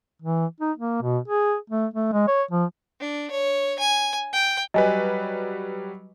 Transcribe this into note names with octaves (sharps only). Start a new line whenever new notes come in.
E3
D#4
A#3
B2
G#4
A3
A3
G#3
C#5
F3
D4
C#5
G#5
G5
F#3 G3 B4 D#5 G#5